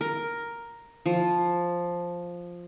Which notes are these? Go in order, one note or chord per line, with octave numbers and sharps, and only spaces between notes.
A#4
F3